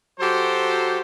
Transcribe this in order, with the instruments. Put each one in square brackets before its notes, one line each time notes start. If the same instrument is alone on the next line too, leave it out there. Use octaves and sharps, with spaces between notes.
[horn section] F#3 F#4 G4 A4 C5